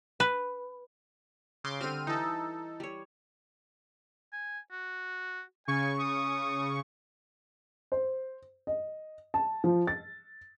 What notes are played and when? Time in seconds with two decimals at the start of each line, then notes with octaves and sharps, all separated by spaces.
0.20 B4
1.64 C#3 C6 D6
1.81 D3 G3 C4 F6 D#7
2.07 E3 D#4 A4
2.80 G3 C#5
4.33 G#5
4.71 F#4
5.68 C#3 G#5 C#6
6.00 D#6
7.92 C5
8.67 D#5
9.34 A5
9.64 F3
9.87 A6